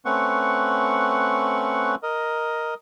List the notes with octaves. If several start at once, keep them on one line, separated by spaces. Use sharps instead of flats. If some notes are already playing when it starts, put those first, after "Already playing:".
A3 C4 C#4 B4 F#5 C#6
A#4 D#5